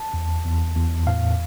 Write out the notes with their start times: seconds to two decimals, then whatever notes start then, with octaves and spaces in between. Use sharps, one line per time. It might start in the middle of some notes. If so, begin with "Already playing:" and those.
Already playing: A5
0.14 E2
0.45 E2
0.76 E2
1.07 A2 F5